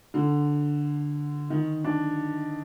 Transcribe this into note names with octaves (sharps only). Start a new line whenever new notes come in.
D3
D#3
D4